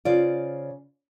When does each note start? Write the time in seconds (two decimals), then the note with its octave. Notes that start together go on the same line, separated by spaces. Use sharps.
0.05 C#3 F4 C5 D5